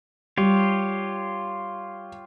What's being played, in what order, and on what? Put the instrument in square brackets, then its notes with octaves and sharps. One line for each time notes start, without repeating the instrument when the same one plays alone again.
[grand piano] G3 [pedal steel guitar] F4 G4 C#5